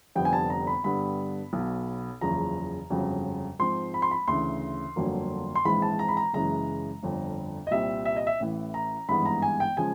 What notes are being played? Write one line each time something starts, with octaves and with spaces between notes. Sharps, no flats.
F1 F2 D3 G3 B3 G5
G#5
A5
A#5
B5
G2 D3 G3 B3 B5
B1 B2 F#3
F#1 E2 C#3 F3 A#5
G1 F2 C#3 F#3
G#2 F3 G#3 C4 C6
B5
C6
B5
D2 C#3 E3 C6
G1 F2 D3 F#3 A#3
C6
A#1 G#2 E3 G#3 C4 B5
A5
A#5
B5
A#5
F#1 F#2 C#3 E3 G#3 A#5
G1 F2 D3
D#5
C2 A#2 G3 C4 E5
E5
D#5
E5
A1 A2 E3
A#5
G#1 G2 E3 G#3 B3 B5
A#5
G#5
G5
C#3 F3 G#3 G#5